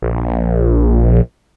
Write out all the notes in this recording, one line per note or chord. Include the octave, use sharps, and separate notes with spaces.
A#1